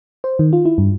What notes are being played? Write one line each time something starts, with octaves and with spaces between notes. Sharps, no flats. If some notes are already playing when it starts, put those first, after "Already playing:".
C5
D#3
F4
E4
G2